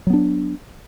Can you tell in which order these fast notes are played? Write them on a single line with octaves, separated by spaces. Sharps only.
F#3 B3 D4